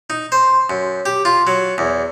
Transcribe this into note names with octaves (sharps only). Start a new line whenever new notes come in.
D#4
C5
F#2
G4
F4
F#3
E2